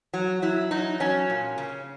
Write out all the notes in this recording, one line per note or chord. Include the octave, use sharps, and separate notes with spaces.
F#3
F#3 E4
F#3 D#4
F#3 C#4
A#2
C#3